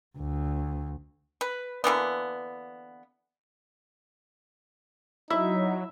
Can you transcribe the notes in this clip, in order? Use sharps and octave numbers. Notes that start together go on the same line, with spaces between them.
D2
B4
D3 E3 A#3 B3
F#3 D#4 E4 E5